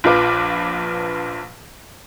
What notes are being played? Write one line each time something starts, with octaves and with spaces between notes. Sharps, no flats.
A#1 F3 F4 B4 D6